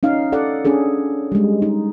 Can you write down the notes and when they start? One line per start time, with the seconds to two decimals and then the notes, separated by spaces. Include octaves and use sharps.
0.03 C#4 D#4 F5
0.32 A4 D5 F#5
0.65 C#4 D4 G#4 A4
1.32 G3 G#3
1.62 D#4